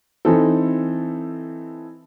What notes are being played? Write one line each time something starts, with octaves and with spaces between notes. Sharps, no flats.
E3 C4 D#4 A4